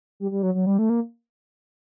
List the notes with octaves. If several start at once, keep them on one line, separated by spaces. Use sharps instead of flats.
G3
G3
F#3
F#3
G3
A3
A#3